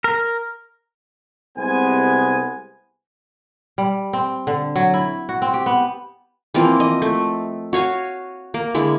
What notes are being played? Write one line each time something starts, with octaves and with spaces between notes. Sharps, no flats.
A#4
C2 C3 G#3 B3 C5 G#5
G3
C4
D3
F#3
E4
F#4
C4
G4
B3
E3 F3 A#3 C4
D#5
A3
F#4 C#5 F5 G#5
A#3
D3 G#3 E4